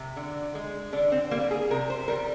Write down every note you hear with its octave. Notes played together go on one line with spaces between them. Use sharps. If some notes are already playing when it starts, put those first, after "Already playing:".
Already playing: C3
D3
G#3
D3 D4
C4
G3 A#3
G#4
C3 A#4
C5
G3 A#4